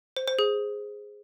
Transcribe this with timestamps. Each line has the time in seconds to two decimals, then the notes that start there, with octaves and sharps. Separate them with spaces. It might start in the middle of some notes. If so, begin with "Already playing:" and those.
0.17 C5
0.28 C5
0.39 G#4